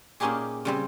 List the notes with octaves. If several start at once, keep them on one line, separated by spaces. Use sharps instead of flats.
A#2 A#3 C#4 D#4 G4 G#4
C#3 G3 C4